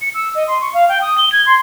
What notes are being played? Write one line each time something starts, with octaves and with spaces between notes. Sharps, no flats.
C#7
E6
D#5
C6
C#6
F5
G5
D#6
G7
G#6
C6